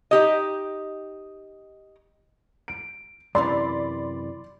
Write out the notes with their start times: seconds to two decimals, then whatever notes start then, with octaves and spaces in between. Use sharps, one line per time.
0.11 D#4 G4 D#5
2.68 D7
3.35 F#2 C3 E3 D5 B5 C6